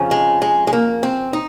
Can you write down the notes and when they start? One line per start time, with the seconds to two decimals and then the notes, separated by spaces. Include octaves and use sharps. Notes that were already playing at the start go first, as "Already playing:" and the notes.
Already playing: F2 C#3 F3
0.11 G#3
0.42 G#3
0.67 G#3
0.73 A#3
1.03 C4
1.33 D#4